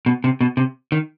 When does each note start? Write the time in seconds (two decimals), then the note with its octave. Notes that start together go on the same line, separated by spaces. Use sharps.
0.06 B2
0.24 C3
0.41 B2
0.57 C3
0.92 D#3